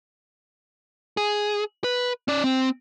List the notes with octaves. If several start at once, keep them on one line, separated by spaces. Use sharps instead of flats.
G#4
B4
C#4 D5
C4